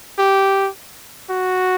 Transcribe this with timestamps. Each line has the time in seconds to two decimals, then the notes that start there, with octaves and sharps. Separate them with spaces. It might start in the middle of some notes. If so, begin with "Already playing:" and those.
0.18 G4
1.30 F#4